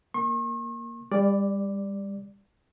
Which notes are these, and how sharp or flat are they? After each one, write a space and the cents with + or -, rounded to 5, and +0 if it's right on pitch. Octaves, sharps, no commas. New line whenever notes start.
A#3 +0 C#6 -45
G3 +30 D5 +0